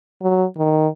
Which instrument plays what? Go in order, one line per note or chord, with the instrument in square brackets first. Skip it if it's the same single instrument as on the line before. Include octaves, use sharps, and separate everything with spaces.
[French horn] F#3
D#3